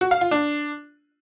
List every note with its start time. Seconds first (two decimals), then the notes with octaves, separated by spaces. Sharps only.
0.01 F#4
0.11 F5
0.21 F4
0.31 D4